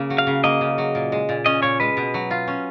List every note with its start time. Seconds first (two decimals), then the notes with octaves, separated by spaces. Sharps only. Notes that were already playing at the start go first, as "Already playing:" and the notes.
Already playing: C#3 A#3
0.10 F#3
0.18 F5
0.27 C#3
0.44 A#3 D#5
0.61 C#3
0.78 F#3
0.95 A#2
1.12 G#3
1.29 A#2
1.46 C#4 D#5
1.63 A#2 C#5
1.80 G#3 B4
1.97 B2
2.14 F#3
2.31 F4
2.48 C#4